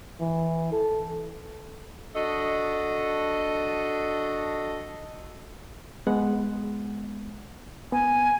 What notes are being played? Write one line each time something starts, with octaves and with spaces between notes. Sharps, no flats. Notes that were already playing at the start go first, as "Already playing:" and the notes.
E3
A4
D4 F#4 A4 D#5
G#3 B3 F#5
B3 G#5